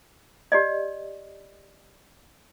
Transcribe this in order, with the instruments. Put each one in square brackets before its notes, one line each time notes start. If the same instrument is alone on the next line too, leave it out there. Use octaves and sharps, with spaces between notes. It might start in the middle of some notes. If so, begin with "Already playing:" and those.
[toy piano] G4 D5 D#5